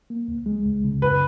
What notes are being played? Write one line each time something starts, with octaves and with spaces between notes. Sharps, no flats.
A#3
C#2
G#3
C#2
C#3
F#2 B4